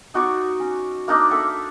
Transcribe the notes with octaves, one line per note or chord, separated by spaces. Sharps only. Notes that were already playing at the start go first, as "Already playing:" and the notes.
D#4 F#4 D5 C#6
C#4
A#3 D4 D#4
A4 E5 F#5